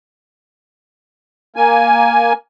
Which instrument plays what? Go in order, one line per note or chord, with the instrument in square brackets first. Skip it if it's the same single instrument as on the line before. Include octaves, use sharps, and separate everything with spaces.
[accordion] A#3 G#5